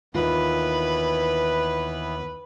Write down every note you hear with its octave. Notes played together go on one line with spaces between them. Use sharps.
D#2 E3 B3 F4 B4